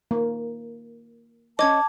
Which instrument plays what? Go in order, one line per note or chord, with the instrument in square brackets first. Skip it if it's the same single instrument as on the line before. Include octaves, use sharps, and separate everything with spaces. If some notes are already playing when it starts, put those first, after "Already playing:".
[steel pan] A#3
[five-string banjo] C#4 D#5 [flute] A5 [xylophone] D6 G#6